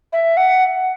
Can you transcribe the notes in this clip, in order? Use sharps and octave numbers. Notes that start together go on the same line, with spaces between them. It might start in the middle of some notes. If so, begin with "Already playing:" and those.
E5
F#5